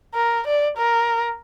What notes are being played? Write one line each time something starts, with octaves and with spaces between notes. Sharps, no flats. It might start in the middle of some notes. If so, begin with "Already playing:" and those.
A#4
D5
A#4